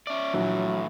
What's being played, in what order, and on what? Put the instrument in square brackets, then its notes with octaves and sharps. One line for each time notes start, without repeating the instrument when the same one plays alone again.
[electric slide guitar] C#4 D5 [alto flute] E5
[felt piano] A#1 [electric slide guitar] A2 E3 [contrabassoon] F#3